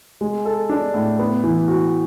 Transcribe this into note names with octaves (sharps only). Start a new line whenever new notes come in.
G#3
A4
D4
A2
B3
E3
F#4